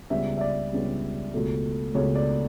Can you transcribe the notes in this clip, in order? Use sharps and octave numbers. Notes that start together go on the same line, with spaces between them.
C#2 C#3 G3 B3 E5
E5
D5
C#2 C#3 G3 B3
C#2 B2 A3
C#2 B2 A3 C#5
D5